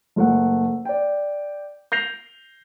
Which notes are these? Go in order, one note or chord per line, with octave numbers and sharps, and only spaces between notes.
F#1 A3 F#5
D5 G5
G6 A#6 C7 F7